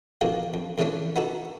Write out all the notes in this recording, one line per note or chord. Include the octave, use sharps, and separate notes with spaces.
B2 D3 F3 A#3
F2
F2 C#3 E3 A3 C#4 D4
B3 D#4 F#4 A4